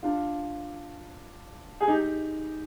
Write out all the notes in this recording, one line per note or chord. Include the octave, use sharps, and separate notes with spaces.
D4 F4
G#4
D#4 G4